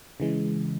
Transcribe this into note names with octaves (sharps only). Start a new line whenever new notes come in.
C#3 E3 G#3